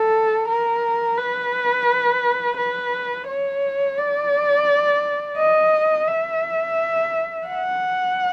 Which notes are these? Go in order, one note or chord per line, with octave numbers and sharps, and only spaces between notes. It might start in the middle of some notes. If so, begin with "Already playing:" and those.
Already playing: A4
A#4
B4
B4
C#5
D5
D#5
E5
F#5